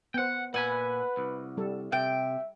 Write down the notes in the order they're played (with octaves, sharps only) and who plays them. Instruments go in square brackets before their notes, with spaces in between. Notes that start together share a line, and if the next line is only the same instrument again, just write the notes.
[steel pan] B3 C5 [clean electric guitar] F#5 G5
[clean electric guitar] A#2 G#5 [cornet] B4 [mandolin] F#5 B5
[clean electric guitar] C2
[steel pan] G3 A4
[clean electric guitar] C3 [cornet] E5 [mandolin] G5